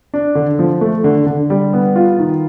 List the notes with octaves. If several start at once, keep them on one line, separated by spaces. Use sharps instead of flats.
D4
D3
F3
A3
D3
D3
G3
B3
F4
D#3